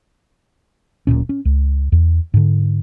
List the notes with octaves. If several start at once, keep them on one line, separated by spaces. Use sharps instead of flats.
D1 G#1 A#2 C#4
C#4
C#2
E2
G#2 D3